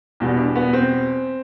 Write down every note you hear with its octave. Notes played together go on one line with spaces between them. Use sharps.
E2 B2 G3
D4
B3
C4